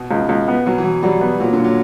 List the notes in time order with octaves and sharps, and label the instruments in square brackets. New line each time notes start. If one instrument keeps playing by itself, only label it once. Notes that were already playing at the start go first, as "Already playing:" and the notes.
Already playing: [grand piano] B2
[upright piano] C#2
C#2
B3
[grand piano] B2 [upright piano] F#3
[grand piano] E3
[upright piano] F#3
[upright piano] F#3 [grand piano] G3
[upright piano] B3
[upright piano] A#2 [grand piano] F#3
[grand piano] D3
[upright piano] A#2
[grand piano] F#3